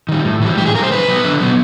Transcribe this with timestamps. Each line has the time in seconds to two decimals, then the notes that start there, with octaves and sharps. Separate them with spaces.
0.09 D#3 G3
0.25 A2
0.42 E3 G3
0.58 A2 G4
0.66 G#4
0.75 E3 A#4
0.78 G3
0.83 C5
0.91 D3 B4
1.08 F#3 B3
1.24 D3
1.40 F#3 B3